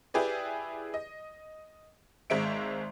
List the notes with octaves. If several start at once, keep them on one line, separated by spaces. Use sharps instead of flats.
E4 G4 G#4 B4 D5
D#5
G#1 G#3 C5 E5 D7